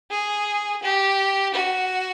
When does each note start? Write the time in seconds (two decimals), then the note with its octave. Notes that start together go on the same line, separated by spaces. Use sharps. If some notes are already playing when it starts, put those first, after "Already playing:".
0.11 G#4
0.83 G4
1.55 F#4